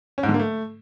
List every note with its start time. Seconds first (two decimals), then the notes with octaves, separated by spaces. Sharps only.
0.18 C#4
0.23 G#2
0.29 D3
0.34 A#3
0.40 A3